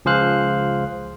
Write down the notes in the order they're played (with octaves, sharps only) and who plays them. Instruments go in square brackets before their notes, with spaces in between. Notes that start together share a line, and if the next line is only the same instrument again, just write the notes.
[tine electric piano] C#2 F3 G#4 C5 F5 F#6